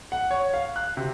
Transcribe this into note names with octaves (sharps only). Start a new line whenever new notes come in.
F#5
C#5
F5
F#6
C3